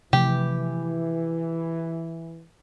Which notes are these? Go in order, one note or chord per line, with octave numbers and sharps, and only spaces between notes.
C3 E3 F3 A3 G4